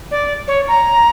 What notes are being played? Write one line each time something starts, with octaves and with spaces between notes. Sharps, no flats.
D5
C#5
A#5